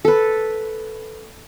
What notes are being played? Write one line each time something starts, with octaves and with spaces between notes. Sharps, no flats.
A4 B4